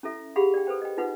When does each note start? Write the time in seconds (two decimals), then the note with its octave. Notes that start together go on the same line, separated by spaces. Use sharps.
0.03 C#4 E4 A4 E5
0.36 G4 G#4 F5 F#5 B5
0.54 D5 G5
0.67 A4 B4 C5 G5
0.82 D#5 G5
0.97 D#4 F4 B4 F#5